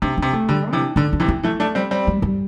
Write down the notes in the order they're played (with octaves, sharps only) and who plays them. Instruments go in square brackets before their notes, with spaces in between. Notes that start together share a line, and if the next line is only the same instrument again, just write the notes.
[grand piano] C3 [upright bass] D4
[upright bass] D4
[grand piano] C3
[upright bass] A3
[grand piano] D3 [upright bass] G3
[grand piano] C3 E3 [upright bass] D4
[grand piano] D3 [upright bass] D4
[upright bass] D4
[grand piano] C3 E3
[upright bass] E4
[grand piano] E3 A3
A3 D4
G3 C4
G3 C4
[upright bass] G3
G3